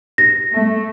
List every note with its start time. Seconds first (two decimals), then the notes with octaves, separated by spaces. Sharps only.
0.18 A#6
0.53 A3